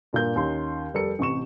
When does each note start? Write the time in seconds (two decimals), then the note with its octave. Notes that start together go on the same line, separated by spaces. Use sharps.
0.13 G2 A#2 A#3 G6
0.36 D#2 C#4 D#4 C6
0.94 F1 G3 A4 A#4 C#7
1.19 A1 C3 C#6 E7